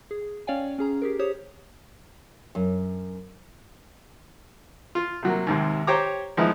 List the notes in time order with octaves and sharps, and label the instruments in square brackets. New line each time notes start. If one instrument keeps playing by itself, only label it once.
[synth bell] G#4
C#4 C#5 D5 F5 G5 G#5
C#4 G#4 A#5
G4 G#4 A#4
G4 C5 C#5 D#6
[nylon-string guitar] F#2
[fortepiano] F4
C3 F#3 A#3
D#2 G#2 C3
G4 C5 C#5 G5 A#5 D6
F3 G#3 B3 D#4 E4